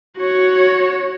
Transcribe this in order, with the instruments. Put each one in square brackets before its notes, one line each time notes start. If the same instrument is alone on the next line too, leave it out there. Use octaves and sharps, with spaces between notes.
[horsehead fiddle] F#4 C#5